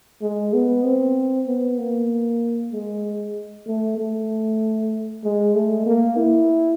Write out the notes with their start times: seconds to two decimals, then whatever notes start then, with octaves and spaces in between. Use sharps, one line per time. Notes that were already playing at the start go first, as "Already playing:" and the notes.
0.22 G#3
0.53 B3
0.84 C4
1.47 B3
1.78 A#3
2.72 G#3
3.67 A3
3.97 A3
5.24 G#3
5.55 A3
5.86 A#3
6.17 E4